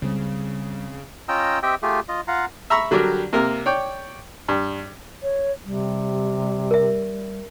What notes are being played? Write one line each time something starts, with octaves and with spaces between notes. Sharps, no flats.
C#2 C#3 G3 C4
C#4 F4 D#5 G5 A#5 E6
C4 G4 D#5 E5 G5
A3 F4 G4 G#4
F4 D#5
F4 F5 F#5 A#5
E5 A#5 B5 C#6 E6
D3 F#3 G3 D4 G4 A#4
C3 A#3 A#4
C#5 D5 G5
G2
C#5
C3 G3
A#4 E5